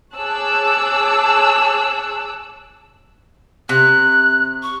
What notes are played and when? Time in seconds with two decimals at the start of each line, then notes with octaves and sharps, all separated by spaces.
0.16 G#4 C#5 A5 D6 E6 F#6
3.69 C3 F#6
4.63 C#6